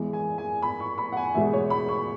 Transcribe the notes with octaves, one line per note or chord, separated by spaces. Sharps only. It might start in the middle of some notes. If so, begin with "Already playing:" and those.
Already playing: E2 E3 G#3
G#5
G#5
B5
C#6
B5
F#5
G#5
E2 B2 G#3 E5
C#5
B5
C#6